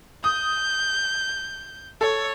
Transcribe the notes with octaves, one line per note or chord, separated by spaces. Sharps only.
D#6 G6
A4 C#5